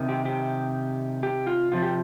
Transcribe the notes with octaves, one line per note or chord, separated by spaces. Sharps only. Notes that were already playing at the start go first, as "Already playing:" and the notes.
Already playing: C3 D#3
G4
G4
G4
F4
C3 F3 F4
G4